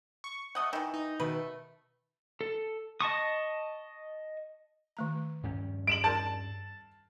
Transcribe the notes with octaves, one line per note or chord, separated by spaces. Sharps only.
C#6
A3 D#5 F#5
D#3 E3
D#4
B2 D#3 A3 B4
A4
D#5 A5 C#6 D#6
D#3 A3 A#5
G2 C#4
G3 D7 E7 F#7
G#4 A#4 D5 A5